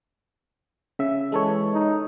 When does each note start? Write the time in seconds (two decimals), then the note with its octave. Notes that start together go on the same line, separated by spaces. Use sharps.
0.99 C#3 E5
1.32 E3 G#3 A4 C#5
1.73 D#4